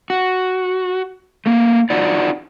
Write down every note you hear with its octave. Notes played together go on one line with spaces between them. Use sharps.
F#4
A3 A#3
D#4 F4 F#4 D5